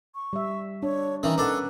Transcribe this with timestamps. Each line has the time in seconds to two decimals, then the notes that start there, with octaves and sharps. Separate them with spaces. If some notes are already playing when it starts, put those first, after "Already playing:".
0.15 C#6
0.33 G3 E5
0.83 D4 C#5
1.23 D#3 E3 C#4 D#4 A#4
1.38 D4 A4 B4 F#5